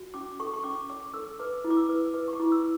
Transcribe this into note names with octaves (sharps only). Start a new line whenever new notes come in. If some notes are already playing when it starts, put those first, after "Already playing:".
Already playing: F#4
C#4 D6
A4 C#6
C#6
C#4 D6
C#5 D6
A4 E6
B4 D6
E4
D6
E6
B4
B4 D6
C#6
D6
E4
E6